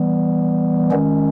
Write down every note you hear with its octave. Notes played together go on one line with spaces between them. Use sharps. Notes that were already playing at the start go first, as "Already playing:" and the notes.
Already playing: E3 G3 B3
D#3 G#3 C#4